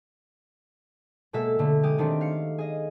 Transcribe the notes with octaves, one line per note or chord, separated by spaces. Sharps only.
B2 G#3 A#3 A4 E5 E6
B2 D3 A3
G#3 G4 D#6
D#3 A3 C4 D4
F5 C#7
G#4 D#5